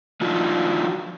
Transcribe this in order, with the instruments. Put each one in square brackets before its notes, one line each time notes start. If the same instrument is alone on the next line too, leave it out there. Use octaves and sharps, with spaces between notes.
[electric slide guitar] F3 D4 D#4 F4 F#4